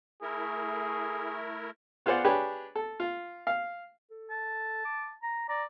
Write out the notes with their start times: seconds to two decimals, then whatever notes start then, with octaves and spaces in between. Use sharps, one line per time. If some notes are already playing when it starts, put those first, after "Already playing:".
0.22 A3 E4 G#4 A#4
2.06 B3 F4 G#4 C5 D5 F#5
2.24 D4 G4 G#4 B4 C#5
2.75 A4
3.00 F4
3.47 F5
4.10 A4
4.31 A5
4.85 D6
5.22 A#5
5.49 D5 A#5